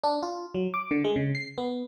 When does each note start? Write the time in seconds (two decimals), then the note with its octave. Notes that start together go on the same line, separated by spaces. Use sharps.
0.04 D4
0.23 F4
0.54 F#3
0.74 D6
0.91 D3
1.04 G#3
1.16 C#3
1.35 C7
1.58 B3